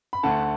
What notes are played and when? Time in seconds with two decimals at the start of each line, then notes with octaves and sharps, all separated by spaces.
0.13 B5
0.23 D2 D3 A3 F#5 A5